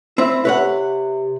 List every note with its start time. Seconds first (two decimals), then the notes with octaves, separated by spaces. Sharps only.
0.18 C4 E4 E5
0.45 C3 B4 C#5 F#5